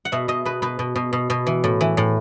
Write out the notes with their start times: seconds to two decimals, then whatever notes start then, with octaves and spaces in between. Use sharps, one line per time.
0.05 F#5
0.12 B2 E5
0.28 B2 D#5
0.45 B2 B4
0.62 B2 B4
0.79 B2
0.96 B2
1.13 B2
1.30 B2
1.46 E3
1.64 A2
1.81 E3
1.97 A2